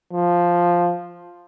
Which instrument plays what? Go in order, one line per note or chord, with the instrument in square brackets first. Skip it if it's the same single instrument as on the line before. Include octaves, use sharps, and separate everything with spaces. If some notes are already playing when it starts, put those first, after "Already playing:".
[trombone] F3